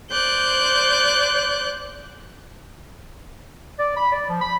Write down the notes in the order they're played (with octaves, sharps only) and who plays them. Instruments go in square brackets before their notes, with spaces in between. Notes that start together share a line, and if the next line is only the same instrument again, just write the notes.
[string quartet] C5 D5 F#6 G6
[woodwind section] D5
B5
D5
F3
B5